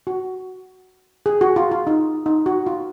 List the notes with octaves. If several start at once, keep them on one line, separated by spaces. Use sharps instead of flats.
F#4
G#4
F#4
F4
F4
D#4
D#4
F#4
F4